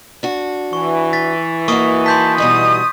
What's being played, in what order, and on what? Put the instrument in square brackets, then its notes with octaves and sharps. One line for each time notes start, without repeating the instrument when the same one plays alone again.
[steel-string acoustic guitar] D4 F#4
[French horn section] E3 [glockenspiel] C#6
[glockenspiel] A6 B6
[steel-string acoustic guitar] A#3 D#4 F#4 [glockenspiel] C#6 D#6
[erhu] A5 [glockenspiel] C6 G6 B6
[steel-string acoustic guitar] B2 G3 D#4 [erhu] D#6